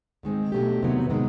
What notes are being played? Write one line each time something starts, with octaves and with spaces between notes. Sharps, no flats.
G#2 D#3 G#3 C4
B2 F#3 A3 D4 G4
E2 C3 D#3 F#3 B3
C3 D#3 G#3 B3